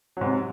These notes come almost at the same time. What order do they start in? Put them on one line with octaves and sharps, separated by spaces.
F#3 G#2 C3